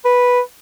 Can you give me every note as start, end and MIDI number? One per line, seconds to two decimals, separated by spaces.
0.05 0.41 71